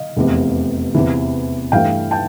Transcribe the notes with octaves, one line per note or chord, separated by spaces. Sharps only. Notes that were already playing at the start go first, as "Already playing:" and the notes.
Already playing: D#5 F5
F1 E2 C3
E2 C3 E3
G2 E3 A3 F5 G5
G5 A5